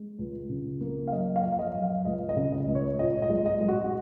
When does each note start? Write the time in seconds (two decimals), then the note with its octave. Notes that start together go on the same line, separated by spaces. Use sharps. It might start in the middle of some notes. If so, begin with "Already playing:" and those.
Already playing: G#3
0.19 C#2
0.49 C#3
0.81 A#3
1.08 F5
1.12 F#2 D#5
1.36 F5
1.44 F3
1.52 F5
1.59 D#5
1.74 F#2
1.82 F5
2.05 C#2 D#5
2.29 D#5
2.37 C#3
2.52 D#5
2.67 C#2
2.75 C#5
2.99 A#2 D#5
3.22 D#5
3.30 G#3
3.46 D#5
3.61 G#3
3.68 F#4
3.84 F#4